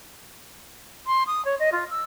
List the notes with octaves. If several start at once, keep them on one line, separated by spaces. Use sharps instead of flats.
C6
D#6
C#5
D#5
F4
E6